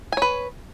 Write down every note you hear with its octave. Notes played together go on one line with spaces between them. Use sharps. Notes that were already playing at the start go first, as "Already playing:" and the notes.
B4 C#5 G#5